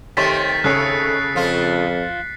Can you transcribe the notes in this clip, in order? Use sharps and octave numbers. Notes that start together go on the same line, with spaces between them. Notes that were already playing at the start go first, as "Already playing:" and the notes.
C3 D#3 A3 G4 C#5 C6 A6 B6
C#3 A4 C#5 F#6 C7 C#7
F2 F3 F4